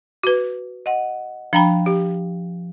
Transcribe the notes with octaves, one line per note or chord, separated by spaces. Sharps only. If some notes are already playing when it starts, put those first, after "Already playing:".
F#4 B4
D#5 F#5
F3 D4 G5 A#5 B5
G4